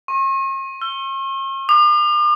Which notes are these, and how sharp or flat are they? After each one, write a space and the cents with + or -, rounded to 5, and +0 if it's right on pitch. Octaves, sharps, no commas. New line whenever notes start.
C#6 -45
E6 +40
D6 +45